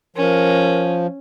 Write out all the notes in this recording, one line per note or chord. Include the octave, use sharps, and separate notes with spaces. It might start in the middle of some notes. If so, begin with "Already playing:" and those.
F3 C#4 A#4